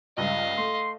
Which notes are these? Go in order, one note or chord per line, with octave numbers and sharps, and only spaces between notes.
C#2 G2 D#5 F5
A3 C6